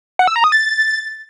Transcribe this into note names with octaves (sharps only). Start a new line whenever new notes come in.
F#5
E6
A#5
D#6
A6